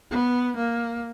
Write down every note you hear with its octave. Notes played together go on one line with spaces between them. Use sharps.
B3
A#3